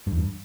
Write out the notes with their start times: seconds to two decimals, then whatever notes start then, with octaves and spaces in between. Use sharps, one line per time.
0.07 G2
0.12 E2
0.18 G2